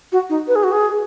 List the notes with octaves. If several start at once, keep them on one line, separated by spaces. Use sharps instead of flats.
F#4
D#4
B4
G#4
F#4
G#4